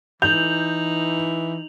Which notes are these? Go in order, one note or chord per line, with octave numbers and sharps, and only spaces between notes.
E3 D#4 G6 F7 F#7